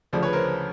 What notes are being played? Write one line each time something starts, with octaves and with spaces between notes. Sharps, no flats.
D2 C#3 F3 C5 D5
B4 C#5
A#4 C5